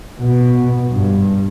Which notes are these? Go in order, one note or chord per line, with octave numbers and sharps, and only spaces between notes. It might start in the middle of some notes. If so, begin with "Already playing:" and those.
B2
G2